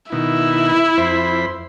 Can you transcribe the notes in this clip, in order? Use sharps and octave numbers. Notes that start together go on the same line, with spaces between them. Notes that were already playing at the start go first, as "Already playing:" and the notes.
B2 D#3 E4
F2 C5 B5